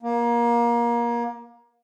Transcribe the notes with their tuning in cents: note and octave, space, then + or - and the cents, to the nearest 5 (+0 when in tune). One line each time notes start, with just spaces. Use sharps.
A#3 +25